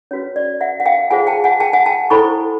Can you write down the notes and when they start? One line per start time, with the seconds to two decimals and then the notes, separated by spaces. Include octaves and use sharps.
0.11 C#4 F#4 B4 C#5
0.36 D5
0.61 E5 F#5
0.80 F#5
0.86 F5 G5
1.11 F4 G#4 C5 F#5 G#5
1.27 G5 A5
1.44 F#5 G#5
1.60 G5 A5
1.73 F#5 G#5
1.86 G5 A5
2.10 E4 A4 C5 B5 C#6